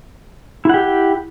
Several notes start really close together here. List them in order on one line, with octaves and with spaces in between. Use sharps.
E4 F#5 G4 G5